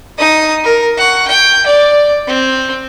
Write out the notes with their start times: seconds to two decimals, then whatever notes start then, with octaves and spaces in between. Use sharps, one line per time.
0.18 D#4 D#6
0.64 A#4
0.97 F#5 C#6
1.28 G5
1.66 D5
2.27 C4